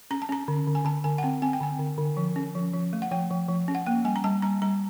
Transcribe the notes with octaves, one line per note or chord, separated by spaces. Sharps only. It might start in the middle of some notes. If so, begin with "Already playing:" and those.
C#4 A#5
A5
C#4 A#5
D3
D3
G#5
D3 A5
D3 G#5
F#5
C4 G5
C4 G#5
G5
D3 G#5
D3
D3
F3
C#4
F3
F3
A3
F#5
F3 G5
F3
F3
C#4
F#5
A#3 G5
G3 G#5
A#5
G3 A5
G3 A#5
G3 A#5